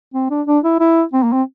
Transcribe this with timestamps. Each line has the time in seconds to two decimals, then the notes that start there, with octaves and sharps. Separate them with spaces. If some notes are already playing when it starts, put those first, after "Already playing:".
0.14 C4
0.30 D4
0.47 D4
0.64 E4
0.80 E4
1.13 C4
1.23 A#3
1.33 C4